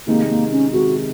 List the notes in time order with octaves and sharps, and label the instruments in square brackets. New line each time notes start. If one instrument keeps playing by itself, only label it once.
[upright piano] C3 D#3 G#3 D#4 [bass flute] A#3
[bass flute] A#3
C#4
[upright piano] C3 D#3 G#3 D#4 [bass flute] F#4